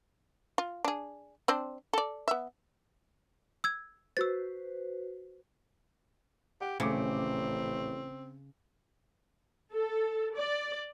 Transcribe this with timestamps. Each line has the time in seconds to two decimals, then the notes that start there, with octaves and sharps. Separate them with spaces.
0.58 F4
0.85 D4 G#4
1.48 C4 D4 C5
1.93 A4 D5
2.28 B3 E5
3.64 E6 G#6
4.17 F#4 B4 C5 E6 A6
6.61 G4 F#5
6.80 D#1 A1 C#3 A3 C4 D6
9.73 A4
10.36 D5